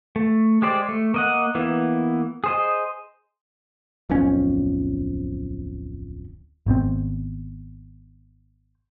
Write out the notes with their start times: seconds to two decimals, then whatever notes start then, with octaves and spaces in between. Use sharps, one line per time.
0.16 A3
0.62 G#3 G4 C5 D5
0.89 A3
1.14 A#3 D#5 F#5
1.55 E3 A#3 B3 E4
2.44 G#4 C5 D#5
4.10 D1 B1 F2 C#4
6.66 G#1 B2 D3 C4